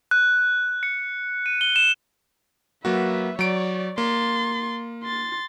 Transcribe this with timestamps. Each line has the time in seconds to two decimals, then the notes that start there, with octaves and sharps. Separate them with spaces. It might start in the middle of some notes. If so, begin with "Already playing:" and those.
0.11 F#6
0.83 C#7
1.46 D#7
1.61 G7
1.76 E7
2.85 F#3 A#3 F#4 B4 E5
3.39 F#3 C#5 D5 D7
3.98 A#3 C6 A6
5.03 C6 A6